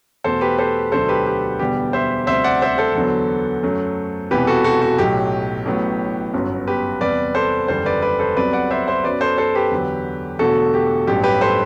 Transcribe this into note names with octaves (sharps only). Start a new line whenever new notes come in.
E2 B2 A3 A4 C5
G4 B4
A4 C5
E1 D2 D3 F#3 A3 A4 C5
G4 B4
G4
E1 E2 D3 G3 B3 G4
C5 E5
D2 C3 G3 C5 E5
D5 F#5
C5 E5
A4 C5
E2 D3 F#3 B3
F#2 F#3 A3
E1 E2 C3 E3 G4 B4
F#4 A4
F#4 A4
F#4
B1 A2 F#3 G4
A1 A2 F#3 B3
G1 F#2 F#3 B3
G4 B4
E2 C3 G3 B4 D5
A4 C5
F#1 E2 D3 G3 B3 A4 C5
B4 D5
B4 D5
A4 C5
C2 C3 F#3 B3 B4 D5
D5 F#5
C5 E5
C5 E5
F#2 F#3 B3 B4 D5
A4 C5
A4 C5
G4 B4
E2 D3 F#3
E1 E2 D3 A3 F#4 A4
G4
A1 G2 F#3 G4
G4 B4
A4 C5